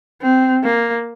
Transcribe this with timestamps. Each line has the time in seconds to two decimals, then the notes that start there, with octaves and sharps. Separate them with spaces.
0.22 C4
0.64 A#3